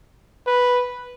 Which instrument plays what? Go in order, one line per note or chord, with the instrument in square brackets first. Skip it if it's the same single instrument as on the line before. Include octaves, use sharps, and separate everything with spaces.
[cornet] B4